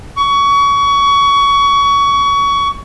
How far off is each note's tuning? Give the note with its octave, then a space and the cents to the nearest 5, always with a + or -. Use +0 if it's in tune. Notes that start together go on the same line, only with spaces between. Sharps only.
C#6 +25